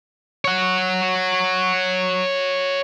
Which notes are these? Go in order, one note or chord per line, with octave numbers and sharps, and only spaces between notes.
C#5 F#5